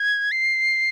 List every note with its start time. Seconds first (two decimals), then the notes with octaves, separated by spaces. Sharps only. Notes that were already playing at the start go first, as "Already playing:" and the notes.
Already playing: G#6
0.32 C7